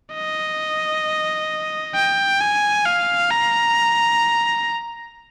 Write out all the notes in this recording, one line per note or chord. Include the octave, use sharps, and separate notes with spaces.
D#5
G5
G#5
F5
A#5